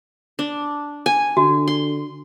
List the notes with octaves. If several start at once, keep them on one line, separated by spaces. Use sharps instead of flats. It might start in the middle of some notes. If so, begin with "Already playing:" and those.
D4
G#5
D3 F#4
C6